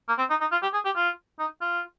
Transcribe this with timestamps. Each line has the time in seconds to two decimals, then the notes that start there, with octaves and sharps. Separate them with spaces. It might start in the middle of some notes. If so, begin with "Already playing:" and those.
0.08 A#3
0.18 C4
0.30 D#4
0.41 D#4
0.52 F4
0.62 G4
0.73 G#4
0.85 G4
0.96 F4
1.39 D#4
1.61 F4